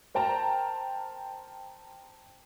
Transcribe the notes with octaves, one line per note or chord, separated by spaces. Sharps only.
A#4 C5 G5 A5 A#5